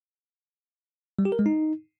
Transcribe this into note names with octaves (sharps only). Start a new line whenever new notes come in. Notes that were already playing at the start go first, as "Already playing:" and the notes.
G3
G4
A#4
G#3
D#4